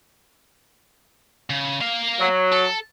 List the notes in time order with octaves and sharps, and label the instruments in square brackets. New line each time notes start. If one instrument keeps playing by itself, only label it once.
[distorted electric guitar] C#3
A#3 F5
[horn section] F#3
[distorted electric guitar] A4